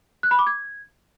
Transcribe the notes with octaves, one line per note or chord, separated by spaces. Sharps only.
F#6
B5
D6
G#6